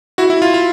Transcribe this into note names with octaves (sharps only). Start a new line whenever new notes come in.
E4 F#4
E4
F4
F4